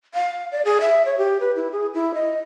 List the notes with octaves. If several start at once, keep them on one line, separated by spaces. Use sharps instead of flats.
F5
D5
G#4
E5
C#5
G4
B4
E4
G#4
E4
D#5